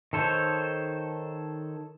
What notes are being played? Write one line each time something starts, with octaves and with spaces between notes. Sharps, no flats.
D#3 A4 C5 C#5